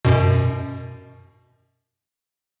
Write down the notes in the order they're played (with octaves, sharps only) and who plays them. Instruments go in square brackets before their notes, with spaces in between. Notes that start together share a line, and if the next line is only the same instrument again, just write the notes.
[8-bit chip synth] F#2 B2